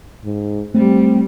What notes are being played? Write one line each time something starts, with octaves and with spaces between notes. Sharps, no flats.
G#2
G3 A3 C4